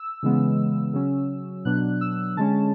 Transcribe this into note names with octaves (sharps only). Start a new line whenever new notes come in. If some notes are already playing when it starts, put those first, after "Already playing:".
Already playing: E6
C#3 E3 G#3 B3
C#3 F#3 C#4
B2 F#3 B3 D4 F#6
E6
D3 G#3 C#4 A5